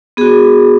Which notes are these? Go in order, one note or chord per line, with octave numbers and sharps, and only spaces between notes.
B3 F#4 G#4